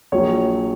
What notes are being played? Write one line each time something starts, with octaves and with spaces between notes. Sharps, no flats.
A#1 A#2 F#3 C#5